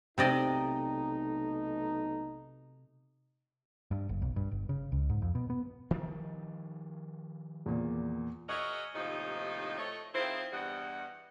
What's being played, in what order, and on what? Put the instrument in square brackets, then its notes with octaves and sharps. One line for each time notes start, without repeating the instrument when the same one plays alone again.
[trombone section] B1 A3 D#4 [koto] C3 D5 D#5
[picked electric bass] G2
F#1
B1
G2
G1
C#3
C#2
G#2
F2
B2
B3
[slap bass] D#3 F3 G3
[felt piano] E2 A#2
[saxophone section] F#4 G#4 A#4 C#5 D#5 E5
D#2 A2 C3 F3 D#4
A3 C#5 D#5
D#3 C4 E4 F4 G#4 C5
E2 G2 G3 D#5 F#5